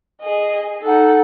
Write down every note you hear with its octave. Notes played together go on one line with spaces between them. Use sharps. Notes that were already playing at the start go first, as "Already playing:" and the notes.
G#4 D#5
D#4 A4 F#5